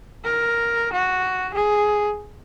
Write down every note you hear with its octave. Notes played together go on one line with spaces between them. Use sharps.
A#4
F#4
G#4